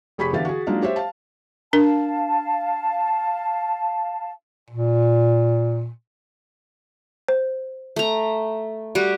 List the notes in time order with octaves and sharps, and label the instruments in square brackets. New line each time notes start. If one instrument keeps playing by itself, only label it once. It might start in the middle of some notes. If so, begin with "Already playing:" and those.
[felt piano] F1 G4 G#4 B5 C#6 B6
D3 E3 B3 G4 F5 A6
F#4 G#4
F#3 G#3 A#3 D4 D#4 F4
G4 C5 C#5 E5
F5 A5
[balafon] D4 A#4 [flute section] F5 A5
[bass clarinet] A#2
[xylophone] C5
[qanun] A3 A#5
G3 F#4 G4